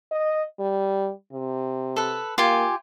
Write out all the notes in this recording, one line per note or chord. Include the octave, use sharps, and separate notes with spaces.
D#5
G3
C3
A4 B4
A#3 F4 G4 G#5